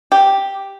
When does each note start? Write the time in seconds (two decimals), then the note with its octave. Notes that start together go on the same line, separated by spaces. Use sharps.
0.12 G4